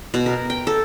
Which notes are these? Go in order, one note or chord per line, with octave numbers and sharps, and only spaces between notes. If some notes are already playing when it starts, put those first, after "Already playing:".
B2
A#4
G5
A4